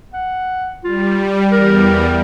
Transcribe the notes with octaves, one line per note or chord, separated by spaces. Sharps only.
F#5
G3 F4
E2 G3 A#4